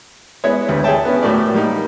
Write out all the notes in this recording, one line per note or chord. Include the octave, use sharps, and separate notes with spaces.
G#3 B3 E4 C#5
D2 G3 B4
G#4 C#5 E5 G5 A5
B3 C#4
A2 A3 F#4 G4 A#4 D5
G3 A#3 D#4